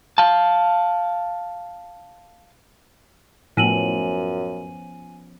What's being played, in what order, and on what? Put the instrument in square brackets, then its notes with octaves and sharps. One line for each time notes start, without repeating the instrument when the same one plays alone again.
[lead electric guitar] F5 A5
[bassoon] F#2 [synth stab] A2 [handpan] F3 B3 C#4 [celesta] G#5 D#7 F#7